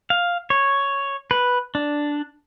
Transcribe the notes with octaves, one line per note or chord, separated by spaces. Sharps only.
F5
C#5
B4
D4